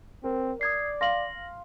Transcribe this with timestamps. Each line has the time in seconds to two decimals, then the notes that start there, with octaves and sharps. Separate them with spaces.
0.24 C4 A#4
0.61 D5 D#6 G#6 C7
1.01 F5 C6 A#6 F#7